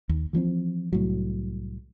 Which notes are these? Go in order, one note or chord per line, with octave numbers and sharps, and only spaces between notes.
D#2
E3 F3 B3 C4
C2 A2 F#3